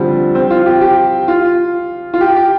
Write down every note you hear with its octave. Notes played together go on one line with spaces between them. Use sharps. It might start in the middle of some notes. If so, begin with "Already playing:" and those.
Already playing: D3 F3 G3 C4
C4
F4
G4
G4
F4
F4
G4
G4